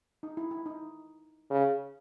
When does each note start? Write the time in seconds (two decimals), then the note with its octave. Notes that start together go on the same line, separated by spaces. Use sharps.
0.23 D#4
0.37 E4
0.51 E4
0.66 D#4
1.50 C#3